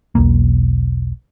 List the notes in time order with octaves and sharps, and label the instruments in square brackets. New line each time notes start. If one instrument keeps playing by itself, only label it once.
[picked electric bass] E1 B1 A#3